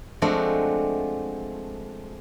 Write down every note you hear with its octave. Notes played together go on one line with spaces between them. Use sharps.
F3 G#3 A3 C4 D4 F#4